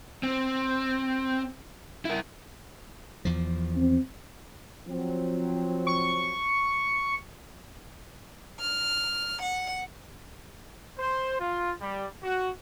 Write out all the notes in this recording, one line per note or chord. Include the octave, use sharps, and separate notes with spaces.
C4
E4 A#4
E2 F3
C4
F3 F#3 C4
C#6
F6
F#5
C5
F4
G3
F#4